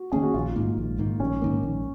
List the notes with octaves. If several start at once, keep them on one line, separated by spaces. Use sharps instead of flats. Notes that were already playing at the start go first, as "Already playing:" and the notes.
Already playing: F#4
D#3 A#3 C#4 G#4
F#4
A#1 F4
G#2 D#3 A#3
A#1
G#2 D#3 A#3
A#1 C#4
G#2 D#3 A#3
A#1